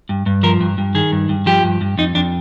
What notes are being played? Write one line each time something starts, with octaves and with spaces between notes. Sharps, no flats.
G2
G2
F3 A#4
G2
G2
D#3 G#4
G2
G2
F3 G4
G2
G2
F2 D#4
F2 D4